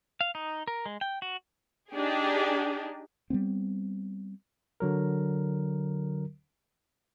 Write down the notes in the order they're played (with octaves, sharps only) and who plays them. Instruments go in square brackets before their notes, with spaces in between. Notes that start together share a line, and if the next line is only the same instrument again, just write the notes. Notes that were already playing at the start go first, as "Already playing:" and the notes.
[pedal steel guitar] F5
D#4
A#4
G#3
G5
F#4
[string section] D4 D#4 G4 G#4
[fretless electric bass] G3 A3 B3 C4
[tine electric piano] D3 F#3 A#4